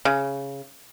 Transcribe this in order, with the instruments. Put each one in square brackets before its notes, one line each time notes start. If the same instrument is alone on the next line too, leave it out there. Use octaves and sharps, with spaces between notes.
[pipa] C#3